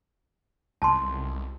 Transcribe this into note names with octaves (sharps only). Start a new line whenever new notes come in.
C2 A5 C6